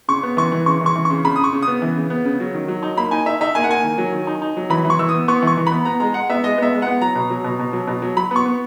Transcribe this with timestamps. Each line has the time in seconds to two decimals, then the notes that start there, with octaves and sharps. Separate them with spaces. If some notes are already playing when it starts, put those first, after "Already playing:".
0.08 C#3 C#6
0.23 B3
0.37 E3 C#6
0.52 E3
0.66 C#3 C#6
0.81 E3 C#6
0.96 E3
1.05 C#3 C#6
1.24 C#3 B5
1.36 C#3 D#6
1.44 C#6
1.53 C#3
1.62 D#6
1.68 B3
1.82 E3
1.96 C#3
2.10 B3
2.25 C#3
2.40 F#3
2.54 D#3
2.68 F#3
2.83 D#4
2.97 A#3 B5
3.11 D#4 G#5
3.26 D#4 E5
3.41 D#4 E5
3.55 A#3 G#5
3.64 F#5
3.69 A#3 G#5
3.83 D#3
3.98 F#3
4.12 D#3
4.27 D#4
4.42 D#4
4.57 F#3
4.70 E3 B5
4.85 E3
4.90 C#6
4.99 E3 E6
5.09 D#6
5.14 B3
5.28 B3 C#6
5.43 E3 C#6
5.58 E3
5.67 B3 B5
5.85 B3 A#5
6.00 G#3 A#5
6.14 G#3 F#5
6.30 B3 E5
6.44 G#3 D#5
6.58 B3 E5
6.72 G#3
6.82 B3 F#5
7.01 F#3 A#5
7.15 B2
7.30 F#3
7.44 B2
7.59 B2
7.73 F#3
7.87 B2
8.02 F#3
8.17 F#3 B5
8.31 B3 C#6
8.46 B3